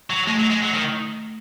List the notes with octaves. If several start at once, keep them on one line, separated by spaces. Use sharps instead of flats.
F#3
G#3 A3
F#3
G#3
F#3
D#3